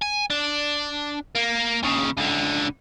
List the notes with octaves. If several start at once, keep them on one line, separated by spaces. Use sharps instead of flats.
G#5
D4
A#3
D#2 C#3
C#2 D3